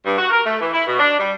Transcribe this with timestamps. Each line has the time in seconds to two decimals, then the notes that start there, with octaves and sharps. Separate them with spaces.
0.05 G2
0.18 F#4
0.30 A#4
0.45 A3
0.60 E3
0.73 E4
0.87 B2
0.99 D4
1.18 G3